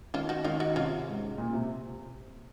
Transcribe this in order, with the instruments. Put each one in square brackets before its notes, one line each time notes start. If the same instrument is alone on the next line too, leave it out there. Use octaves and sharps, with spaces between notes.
[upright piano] D#3 [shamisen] C#4 F4
[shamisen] D#4 F#4
[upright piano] D#3 [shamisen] C#4 F4
[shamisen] D#4 F#4
[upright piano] C3 [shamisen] C#4 F4
[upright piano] G#2
A#2
C3